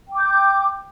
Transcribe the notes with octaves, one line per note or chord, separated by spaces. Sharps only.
G5 D6 G6